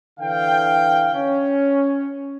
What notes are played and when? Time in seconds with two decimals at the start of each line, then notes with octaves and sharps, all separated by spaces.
0.20 D3 E3 F5 G5
1.14 C#4